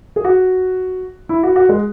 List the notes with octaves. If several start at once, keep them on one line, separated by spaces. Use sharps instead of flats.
G#4
F#4
E4
F#4
F#4
G#3